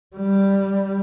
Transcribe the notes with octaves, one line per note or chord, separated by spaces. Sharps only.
G3